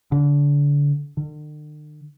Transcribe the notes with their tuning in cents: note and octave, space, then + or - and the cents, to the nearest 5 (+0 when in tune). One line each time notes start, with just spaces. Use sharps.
D3 -30
D3 +45